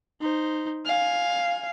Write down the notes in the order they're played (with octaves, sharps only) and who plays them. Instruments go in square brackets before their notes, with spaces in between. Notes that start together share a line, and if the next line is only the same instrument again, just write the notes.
[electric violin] D#4 C5
[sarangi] F5 [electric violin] G#5